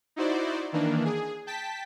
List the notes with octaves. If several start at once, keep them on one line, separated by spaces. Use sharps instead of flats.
D#4 E4 F#4 C5 D5
D#3 E3 A#3 D4
G#4
G5 A5 B6